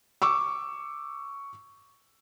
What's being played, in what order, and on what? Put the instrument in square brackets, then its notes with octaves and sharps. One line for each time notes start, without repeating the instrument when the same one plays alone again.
[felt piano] C#6 D6 E6